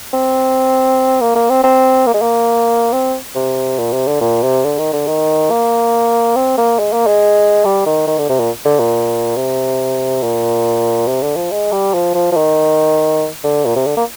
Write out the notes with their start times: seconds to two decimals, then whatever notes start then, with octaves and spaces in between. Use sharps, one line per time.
0.13 C4
1.21 A#3
1.35 A#3
1.50 C4
1.64 C4
2.07 A#3
2.14 G#3
2.22 A#3
2.93 C4
3.35 C3
3.78 A#2
3.93 C3
4.07 D3
4.21 A#2
4.43 C3
4.64 D3
4.78 D#3
4.93 D3
5.07 D#3
5.50 A#3
6.36 C4
6.58 A#3
6.79 G#3
6.93 A#3
7.07 G#3
7.65 G3
7.86 D#3
8.07 D#3
8.18 D3
8.29 C3
8.39 A#2
8.65 D3
8.79 A#2
9.37 C3
10.22 A#2
11.07 C3
11.22 D3
11.36 F3
11.51 G#3
11.72 G3
11.94 F3
12.14 F3
12.32 F3
12.36 D#3
13.44 D3
13.65 A#2
13.76 C3
13.86 D3
13.97 A#3